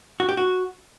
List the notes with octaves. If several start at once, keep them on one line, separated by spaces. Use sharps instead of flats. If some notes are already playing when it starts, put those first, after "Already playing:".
F#4
G4
F#4